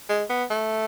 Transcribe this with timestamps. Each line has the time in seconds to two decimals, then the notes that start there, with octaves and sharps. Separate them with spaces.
0.09 G#3
0.30 B3
0.50 A3